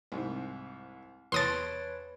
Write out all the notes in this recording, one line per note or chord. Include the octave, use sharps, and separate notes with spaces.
C2 G#2
E2 B4 C#5 A5 C6 D#6 A6 D7